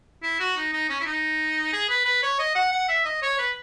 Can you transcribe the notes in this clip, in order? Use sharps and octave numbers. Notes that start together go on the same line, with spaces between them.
E4
F#4
D#4
D#4
C#4
E4
D#4
G#4
B4
B4
C#5
D#5
F#5
F#5
E5
D#5
C#5
B4